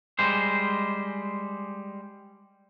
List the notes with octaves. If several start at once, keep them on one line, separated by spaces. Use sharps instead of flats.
G3 G#3 C5